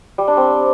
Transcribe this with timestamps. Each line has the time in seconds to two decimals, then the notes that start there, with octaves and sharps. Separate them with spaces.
0.18 G3
0.28 D4
0.37 C4